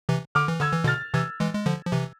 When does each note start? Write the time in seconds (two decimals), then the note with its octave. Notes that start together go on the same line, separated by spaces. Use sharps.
0.09 C3 E3
0.35 D3 D6 F6
0.48 E3
0.61 D3 E6 G#6
0.73 E3
0.84 B2 D3 F6 A6
1.14 C3 E3 E6 G#6
1.40 E3 G#3
1.55 G#3
1.66 D3 F3
1.87 F3
1.92 C3 E3